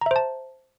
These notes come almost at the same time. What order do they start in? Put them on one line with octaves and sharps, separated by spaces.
A#5 E5 C5 A5